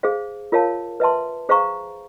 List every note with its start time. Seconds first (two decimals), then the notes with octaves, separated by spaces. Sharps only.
0.03 G#4 C5 F5
0.52 F4 A#4 C#5 F5 A5
1.00 B4 E5 A5 C6
1.49 G#4 C5 F5 A#5 C#6